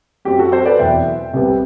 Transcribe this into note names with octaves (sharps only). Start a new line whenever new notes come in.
F#2 F#3 C4 G4
F#4 A4
A4 C5
B4 D5
E2 B2 F#3 E5 G5
C2 C3 G3 B3